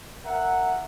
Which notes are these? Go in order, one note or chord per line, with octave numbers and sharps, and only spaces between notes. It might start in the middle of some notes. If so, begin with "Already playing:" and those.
A#4 E5 F#5